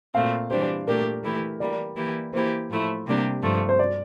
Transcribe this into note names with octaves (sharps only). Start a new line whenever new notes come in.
A#2 A3 C4 F5
E3 G3 D4 G4 C5
A#2 A3 D4 G4 A#4
E3 A3 E4 G4
E3 G3 A#3 D5
E3 A#3 E4 G4
E3 A#3 E4 G4 C5
A2 F3 A3 E4
C3 G3 A#3 D4 G4
G2 F3 A3
C5
D5